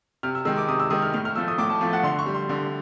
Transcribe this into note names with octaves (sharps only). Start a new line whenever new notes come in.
C3 F6
E6
D#3 G#3 E6
D6
C3 D#6
E6
D#3 G#3 D#6
F6
A2 F6
F6
F3 A3 E6
D#6
A2 D6
A5
F3 A3
F#5
D3 C6
C#6
G3
C6
D3